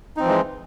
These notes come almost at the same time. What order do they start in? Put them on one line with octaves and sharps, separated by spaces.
D#4 C4 F3 E3 G#3